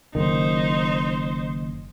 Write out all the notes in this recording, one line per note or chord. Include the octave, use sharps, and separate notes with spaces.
F#1 D#3 D#4 C5